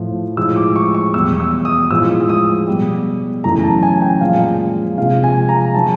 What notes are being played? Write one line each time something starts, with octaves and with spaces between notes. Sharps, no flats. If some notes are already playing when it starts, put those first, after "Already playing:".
Already playing: A2 F3 A3
A2 F3 G#3 E6
D6
C#6
C#6
E2 B2 G3 E6
E6
D#6
A2 F3 G#3 E6
D#6
B2 G3
F#2 C#3 E3 A3 A#5
A5
G#5
G5
A#2 F3 G#3 F5
C3 F3 G#3 F5
G#5
A#5
D#3 F#3 A5